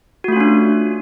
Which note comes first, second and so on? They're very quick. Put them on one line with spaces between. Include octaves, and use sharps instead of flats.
F#4 A3 F4 C#4 D4